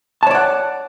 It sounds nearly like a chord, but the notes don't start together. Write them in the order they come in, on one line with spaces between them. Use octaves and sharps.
A5 C#5 D5 F#5